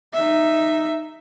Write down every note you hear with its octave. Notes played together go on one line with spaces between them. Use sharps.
D#4 E5